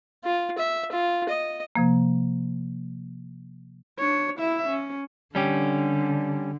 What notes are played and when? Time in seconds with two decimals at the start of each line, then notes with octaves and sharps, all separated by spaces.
0.25 F4
0.58 E5
0.92 F4
1.29 D#5
1.76 C3 F3 A#3
3.99 D4 C#5
4.39 E4 E5
4.69 C#4
5.35 D3 G3 C#4 G4